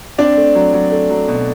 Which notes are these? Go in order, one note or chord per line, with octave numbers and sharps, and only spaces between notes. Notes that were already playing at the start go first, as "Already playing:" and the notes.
C4 D4 D5
A3
F#3
F#3
A3
F#3
B2